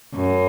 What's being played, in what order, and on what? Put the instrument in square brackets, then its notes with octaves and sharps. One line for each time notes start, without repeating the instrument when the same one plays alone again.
[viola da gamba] F#2